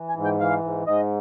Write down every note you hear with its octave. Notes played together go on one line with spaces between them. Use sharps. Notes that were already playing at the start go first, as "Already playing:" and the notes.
Already playing: E3
G#5
G#2
G5
E3 F5
G#2
G#2 D#5